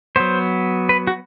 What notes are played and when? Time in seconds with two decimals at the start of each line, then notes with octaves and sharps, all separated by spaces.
0.16 F#3 B3 C5
0.89 B4
1.07 F#4